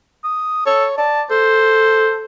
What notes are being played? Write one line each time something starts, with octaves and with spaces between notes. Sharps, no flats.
D#6
A4 C#5
D5 A5
A4 C5